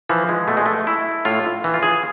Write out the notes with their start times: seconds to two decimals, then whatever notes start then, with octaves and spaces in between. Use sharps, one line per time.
0.09 E3 F3
0.29 G#3
0.48 B2 A3
0.57 G#3
0.66 A3
0.87 E4
1.25 A2 F4
1.64 E3
1.74 F4
1.83 G#4